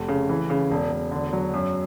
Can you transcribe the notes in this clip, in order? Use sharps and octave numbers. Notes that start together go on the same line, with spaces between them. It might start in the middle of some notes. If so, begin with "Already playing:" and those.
Already playing: F1
C#3
E3
C#3
E1
E1
D3
F#3
F#2